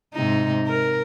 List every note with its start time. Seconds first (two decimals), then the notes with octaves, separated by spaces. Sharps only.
0.14 G#2 C3 D#4
0.67 A#4